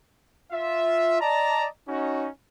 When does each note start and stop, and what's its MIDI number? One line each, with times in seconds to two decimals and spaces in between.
0.52 1.18 65
0.52 1.18 76
1.20 1.67 74
1.20 1.67 75
1.20 1.67 81
1.20 1.67 82
1.87 2.28 61
1.87 2.28 63
1.87 2.28 66